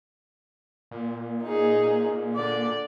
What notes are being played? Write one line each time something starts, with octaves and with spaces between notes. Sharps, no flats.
A#2
D#4 G#4
D3 D5